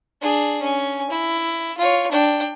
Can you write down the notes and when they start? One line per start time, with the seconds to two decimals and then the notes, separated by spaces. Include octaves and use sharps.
0.22 D4 G#4
0.62 C#4 G#5
1.11 E4
1.78 F4 C#5
2.12 D4 G5